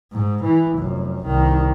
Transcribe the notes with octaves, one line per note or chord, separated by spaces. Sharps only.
G#2
E3
F1 F#2
C2 D#3